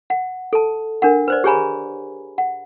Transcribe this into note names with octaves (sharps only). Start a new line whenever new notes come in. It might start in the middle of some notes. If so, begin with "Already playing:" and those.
F#5
A4 A5
D4 A#4 F#5
B4 C5 D5
G4 G#4 C#5 G#5 A#5 B5
F#5